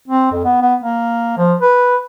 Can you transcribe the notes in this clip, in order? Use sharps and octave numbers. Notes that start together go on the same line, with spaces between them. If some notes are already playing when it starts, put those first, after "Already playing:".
C4
F2
B3
B3
A#3
F3
B4